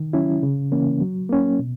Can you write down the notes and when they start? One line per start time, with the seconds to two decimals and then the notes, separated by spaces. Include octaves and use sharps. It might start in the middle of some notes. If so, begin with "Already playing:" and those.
Already playing: D#3
0.13 F#3 C#4 E4
0.43 C#3
0.72 E3 A#3 C#4
1.01 F#3
1.29 A#3 C#4
1.59 B2